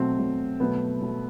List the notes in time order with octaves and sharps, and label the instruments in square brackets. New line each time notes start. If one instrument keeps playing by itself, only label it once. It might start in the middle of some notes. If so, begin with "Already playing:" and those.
Already playing: [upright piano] B2 F#3 A3 [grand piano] C4
[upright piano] B2 F#3 A3
[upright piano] B2 F#3 A3 [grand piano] B3
[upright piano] B2 F#3 A3